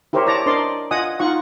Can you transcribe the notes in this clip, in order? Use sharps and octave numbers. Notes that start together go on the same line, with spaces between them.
E4 G4 A#4 C5 C#5
C#5 D5 A5 A#5
D4 A#4 C5 D5 D#5 C6
F4 D#5 F#5 G#5 D#6
D#4 F4 F#5 C#6